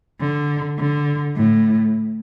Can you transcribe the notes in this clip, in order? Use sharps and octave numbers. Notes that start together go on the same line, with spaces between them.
D3
D3
A2